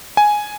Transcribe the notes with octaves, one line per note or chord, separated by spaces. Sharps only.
G#5